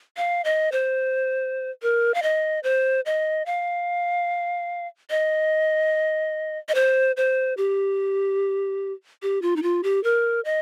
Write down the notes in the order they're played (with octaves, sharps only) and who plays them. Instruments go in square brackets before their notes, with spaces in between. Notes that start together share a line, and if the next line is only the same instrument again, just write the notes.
[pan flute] F5
D#5
C5
A#4
F5
D#5
C5
D#5
F5
D#5
D#5
C5
C5
G4
G4
F4
D#4
F4
G4
A#4
D#5